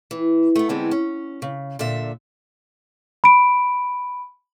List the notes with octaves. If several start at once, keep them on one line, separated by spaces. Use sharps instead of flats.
E3
A3 B3
D3 E3 G3 G#3 B3 C4
C#4
C#3
A#2 D3 E5
B5 D7